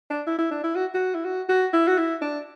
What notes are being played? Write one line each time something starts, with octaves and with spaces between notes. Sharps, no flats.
D4
E4
E4
D4
E4
F#4
F#4
E4
F#4
F#4
E4
F#4
E4
D4